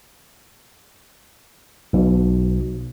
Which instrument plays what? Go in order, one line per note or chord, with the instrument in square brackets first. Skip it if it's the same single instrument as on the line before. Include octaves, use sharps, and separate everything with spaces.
[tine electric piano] B1 B2